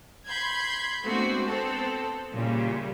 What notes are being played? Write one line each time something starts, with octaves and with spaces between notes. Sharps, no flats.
B5 C6 G6 G#6
G#3 A3 B3 C4 D4 F#4
B3 C4 A4 C5
A#2 C#3 E3 G3